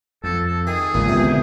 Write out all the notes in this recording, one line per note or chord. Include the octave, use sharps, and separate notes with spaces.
F2 A4
A4
D#3 G#4
G#1 C#2 A#2
E2 C3
D3